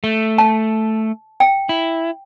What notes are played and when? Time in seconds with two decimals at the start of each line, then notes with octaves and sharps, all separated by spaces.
0.04 A3
0.38 A5
1.40 G5
1.69 E4